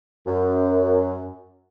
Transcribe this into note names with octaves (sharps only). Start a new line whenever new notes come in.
F#2